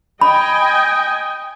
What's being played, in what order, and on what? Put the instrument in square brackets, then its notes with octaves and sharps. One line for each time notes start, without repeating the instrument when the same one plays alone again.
[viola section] D#5 G5 G#5 [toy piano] B5